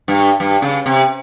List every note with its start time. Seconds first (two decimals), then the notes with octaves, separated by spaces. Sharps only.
0.08 G2
0.40 G2
0.62 C#3
0.86 C3